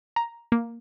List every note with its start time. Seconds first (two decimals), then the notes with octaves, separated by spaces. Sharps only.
0.16 A#5
0.52 A#3